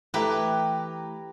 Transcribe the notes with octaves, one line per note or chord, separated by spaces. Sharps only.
E3 A3 E4 G4 B4 E5 G5 A#5